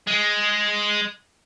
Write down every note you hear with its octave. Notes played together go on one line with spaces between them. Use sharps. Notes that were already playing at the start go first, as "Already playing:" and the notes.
G#3